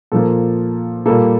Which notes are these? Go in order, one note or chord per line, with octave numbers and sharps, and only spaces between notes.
A#2 F3 A#3 A4
A#2 G3 A#3 A4